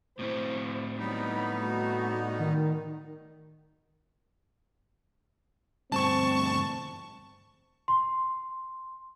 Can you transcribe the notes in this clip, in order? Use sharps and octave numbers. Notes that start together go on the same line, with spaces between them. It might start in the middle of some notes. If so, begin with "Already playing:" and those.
A2 C4 E4 C5
F#3 G3 B3 D#4 B5
A3 F#4
D#3
D2 G2 C4 A5 C#6
C6